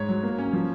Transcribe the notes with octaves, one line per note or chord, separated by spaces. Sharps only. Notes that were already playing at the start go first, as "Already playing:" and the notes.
Already playing: G#2 C#5
F#3
A#3
C#4
F3